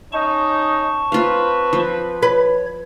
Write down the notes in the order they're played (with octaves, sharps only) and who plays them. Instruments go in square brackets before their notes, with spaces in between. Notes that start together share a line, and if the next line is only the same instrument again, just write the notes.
[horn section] C#4 D#4 [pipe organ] A5 C#6
[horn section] C4 B4 [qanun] F4 F5
[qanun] F3
[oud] B4 [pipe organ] C#5